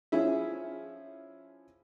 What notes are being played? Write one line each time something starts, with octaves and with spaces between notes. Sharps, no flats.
F3 C#4 E4 G#4 E5